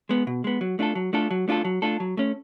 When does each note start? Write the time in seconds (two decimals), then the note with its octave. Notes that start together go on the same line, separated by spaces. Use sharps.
0.09 G#3 B3
0.27 B2
0.44 G#3 B3
0.61 F#3
0.79 A3 D4 F4 A4
0.95 F#3
1.13 A3 D4 F4 A4
1.31 F#3
1.48 A3 D4 F4 A4
1.65 F#3
1.82 A3 D4 F4 A4
2.00 F#3
2.17 A3 C#4